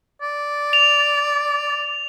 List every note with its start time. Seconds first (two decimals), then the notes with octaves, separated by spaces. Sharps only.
0.21 D5
0.73 F7